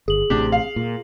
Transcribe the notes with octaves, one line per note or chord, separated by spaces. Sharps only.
G1 G#4 F#7
A1 A2 C3 D4 G4
F5
A#2